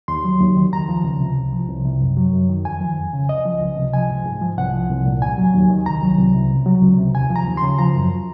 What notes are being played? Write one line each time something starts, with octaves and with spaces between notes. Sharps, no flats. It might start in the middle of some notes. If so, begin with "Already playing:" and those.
D#2 C6
F#3
D#2
D#3
C#2 A#5
F3
C#2
C3
C2
F3
C2
C3
F#2
F#3
F#2
D#3
F2 G#5
F3
F2
C#3
C#2 D#5
F3
C#2
C3
F3 G#5
G#2
G#2
F3
C2 F#5
F3
C2
A#2
D#2 G#5
F#3
D#2
D#3
C2 A#5
F#3
C2
C3
C#2
F#3
C#2
C3
D#2 G#5
F3
A#5
D#2
C6
C#3
F3 A#5
F#2